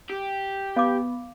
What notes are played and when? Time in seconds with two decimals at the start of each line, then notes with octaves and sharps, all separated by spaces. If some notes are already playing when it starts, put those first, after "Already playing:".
0.10 G4
0.77 B3 F5 D6